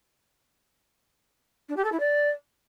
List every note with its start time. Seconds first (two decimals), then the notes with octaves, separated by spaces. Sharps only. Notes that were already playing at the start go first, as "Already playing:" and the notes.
1.69 D4
1.77 G4
1.84 A4
1.92 E4
2.00 D5